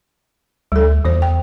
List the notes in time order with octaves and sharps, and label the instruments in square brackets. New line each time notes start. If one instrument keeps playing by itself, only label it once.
[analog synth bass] D2 [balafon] G3 A4
[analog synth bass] E2 [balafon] E3 C5
[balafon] G5